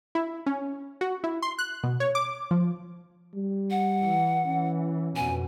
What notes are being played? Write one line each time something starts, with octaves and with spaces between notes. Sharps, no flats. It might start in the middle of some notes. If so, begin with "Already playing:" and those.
E4
C#4
F#4
E4
C6
F#6
B2
C#5
D6
F3
G3
F#5
E3
E3 C#4
F2 B2 G#5